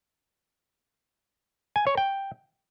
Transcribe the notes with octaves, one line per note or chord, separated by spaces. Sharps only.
G#5
C#5
G5